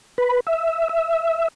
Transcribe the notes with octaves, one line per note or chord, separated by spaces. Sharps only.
B4
E5
E5